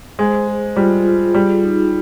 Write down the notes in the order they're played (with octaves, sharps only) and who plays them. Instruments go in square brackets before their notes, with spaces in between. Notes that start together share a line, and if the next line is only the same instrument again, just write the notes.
[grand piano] G#3 [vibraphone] C5
[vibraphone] G#4
[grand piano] G3 [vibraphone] F4
[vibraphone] F4
[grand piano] G3 [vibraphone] G#4
[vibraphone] D#4